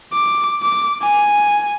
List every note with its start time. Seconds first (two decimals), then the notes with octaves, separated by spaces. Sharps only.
0.13 D6
0.63 D6
1.03 G#5